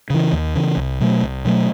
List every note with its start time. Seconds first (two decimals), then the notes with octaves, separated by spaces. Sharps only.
0.10 C#3 E3
0.33 D#2
0.55 C#3 E3
0.77 C2
1.00 B2 F#3 A3
1.23 C2
1.45 B2 F#3 A3